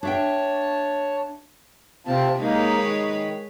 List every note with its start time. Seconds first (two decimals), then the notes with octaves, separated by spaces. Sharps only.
0.03 D4 C#5 E5 G5 A5
2.07 C3 C4 F4 A5
2.40 G#3 A#3 D#4 B4 C#5
2.77 D#3